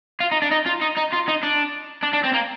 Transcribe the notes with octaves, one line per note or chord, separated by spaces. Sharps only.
F4
D#4
D4
D#4
F4
D#4
D#4
F4
D#4
D4
D4
D4
C4
A#3